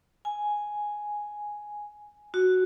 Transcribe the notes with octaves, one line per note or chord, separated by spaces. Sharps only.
G#5
F#4